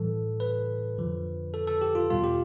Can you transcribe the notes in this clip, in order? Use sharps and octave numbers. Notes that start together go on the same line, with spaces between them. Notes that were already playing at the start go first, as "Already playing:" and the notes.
Already playing: A2 E3 G3 A4
B4
F2 D3 F3
A4
A4
G4
F4
E2 B2 G3 F4
G4